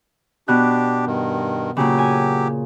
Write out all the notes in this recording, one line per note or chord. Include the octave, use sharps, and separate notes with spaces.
B2 D4 G4 F#6
G2 D#3
A#2 C#3 F#3 G4
G#5